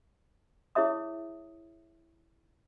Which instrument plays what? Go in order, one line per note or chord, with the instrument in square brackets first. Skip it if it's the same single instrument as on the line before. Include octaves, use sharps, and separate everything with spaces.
[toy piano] E4 G#4 C#5 E5 D#6